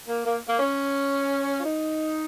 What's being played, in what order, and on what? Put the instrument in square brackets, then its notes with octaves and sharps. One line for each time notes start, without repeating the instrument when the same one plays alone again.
[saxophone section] A#3
A#3
A#3
C#4
F4
D#4